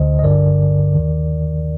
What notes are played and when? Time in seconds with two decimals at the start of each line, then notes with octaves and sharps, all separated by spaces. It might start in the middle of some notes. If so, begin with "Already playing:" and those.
Already playing: D2 D3 C5 D#5
0.19 D#5
0.23 G1 G2 D3 A#4 D5
0.95 D#2 D#3